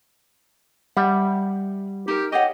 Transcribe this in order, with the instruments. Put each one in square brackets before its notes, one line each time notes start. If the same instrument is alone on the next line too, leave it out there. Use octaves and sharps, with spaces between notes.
[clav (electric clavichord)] G3 [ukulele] E5 F#5
[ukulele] D#4 A#4 [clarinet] G4
[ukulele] G4 C#5 F#5 [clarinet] D#5